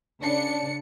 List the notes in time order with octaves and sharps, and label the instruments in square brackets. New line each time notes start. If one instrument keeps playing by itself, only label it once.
[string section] C#3 D4 C#7